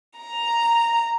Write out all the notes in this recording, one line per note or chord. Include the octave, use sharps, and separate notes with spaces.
A#5